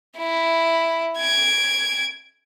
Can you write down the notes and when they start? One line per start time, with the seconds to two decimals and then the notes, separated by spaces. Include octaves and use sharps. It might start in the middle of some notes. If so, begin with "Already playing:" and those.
0.18 E4
1.18 G#6 D7